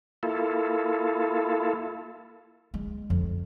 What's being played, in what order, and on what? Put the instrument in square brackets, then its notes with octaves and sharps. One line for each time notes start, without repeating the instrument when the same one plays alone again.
[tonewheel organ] A#3 E4 F4 A4
[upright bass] G#3
F2